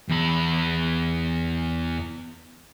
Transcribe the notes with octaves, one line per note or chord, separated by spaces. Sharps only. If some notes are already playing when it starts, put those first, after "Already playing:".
E2 B5